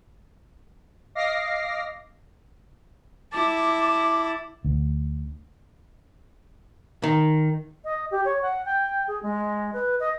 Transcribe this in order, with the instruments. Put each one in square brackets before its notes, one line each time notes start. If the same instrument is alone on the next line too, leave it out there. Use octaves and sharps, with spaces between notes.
[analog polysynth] D#5 F5 D6 A#6 C7
[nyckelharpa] E4 A5 [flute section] D6
[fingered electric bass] D2
[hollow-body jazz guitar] D#3
[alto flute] D#5
G4
C#5
F#5
G5
G#4
G#3
B4
D#5